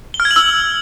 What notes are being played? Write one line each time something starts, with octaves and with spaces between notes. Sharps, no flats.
G7
F6
G#6
F#7
E6